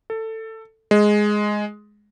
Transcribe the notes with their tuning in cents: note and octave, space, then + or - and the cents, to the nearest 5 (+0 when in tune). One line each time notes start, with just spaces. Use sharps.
A4 +15
G#3 +5